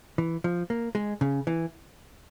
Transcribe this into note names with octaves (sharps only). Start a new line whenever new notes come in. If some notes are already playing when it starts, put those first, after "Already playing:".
E3
F3
A#3
G#3
C#3
E3